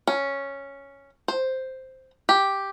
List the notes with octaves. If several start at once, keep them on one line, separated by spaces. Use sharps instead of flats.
C#4
C5
G4